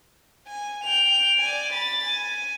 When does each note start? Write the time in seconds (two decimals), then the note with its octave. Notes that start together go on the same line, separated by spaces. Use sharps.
0.47 G#5
0.83 G5 F7
1.42 D5 G#5
1.73 B5 A6
2.05 G#5